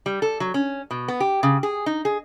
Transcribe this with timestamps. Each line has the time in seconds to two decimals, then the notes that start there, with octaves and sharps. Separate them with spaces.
0.06 G3
0.22 A4
0.40 F#3
0.54 C#4
0.91 B2
1.08 B3
1.20 G4
1.43 C#3
1.63 G#4
1.86 D#4
2.05 G#4